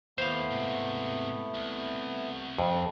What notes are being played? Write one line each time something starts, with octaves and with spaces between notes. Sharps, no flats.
D#2 A3 B3 E4 C5 F5
G#2 C3
C2
F2